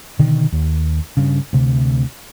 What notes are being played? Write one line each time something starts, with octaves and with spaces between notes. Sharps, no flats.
B2 D3 D#3
D#2
G2 C#3
D2 C3